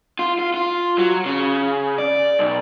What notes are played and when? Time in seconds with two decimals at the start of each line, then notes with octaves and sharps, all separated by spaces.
0.19 F4
0.39 F4
0.54 F4
0.98 F#3
1.25 C#3
1.98 D5
2.39 B1